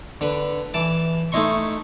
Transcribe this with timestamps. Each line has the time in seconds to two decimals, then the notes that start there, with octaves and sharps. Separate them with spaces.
0.21 D3 B4
0.74 E3 A5 D6
1.32 A3 D#4 E4 D#5 C6 C#6